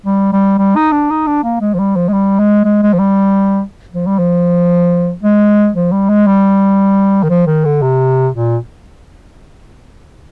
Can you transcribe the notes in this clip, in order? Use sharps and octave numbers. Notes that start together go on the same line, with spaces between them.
G3
G3
G3
D#4
D4
D#4
D4
A#3
G#3
F3
G3
F3
G#3
G3
G#3
G#3
G#3
F3
G3
F3
G3
F3
G#3
F3
G3
G#3
G3
D#3
F3
D#3
D3
C3
A#2